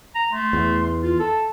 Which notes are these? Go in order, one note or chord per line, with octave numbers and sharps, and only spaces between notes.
A#5
A3 C6
E2
F4
A4 A5